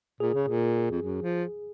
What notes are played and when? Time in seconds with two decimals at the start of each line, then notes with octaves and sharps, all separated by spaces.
0.20 A#2 G#4
0.34 C#3
0.48 A#2
0.91 F2
1.02 F#2
1.23 F3